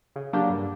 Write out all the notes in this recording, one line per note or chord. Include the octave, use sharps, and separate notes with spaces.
C#3
F#3 A#3 D4 G4
G2